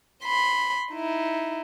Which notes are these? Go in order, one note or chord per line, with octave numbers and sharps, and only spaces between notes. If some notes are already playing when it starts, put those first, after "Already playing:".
B5 C6
D#4 E4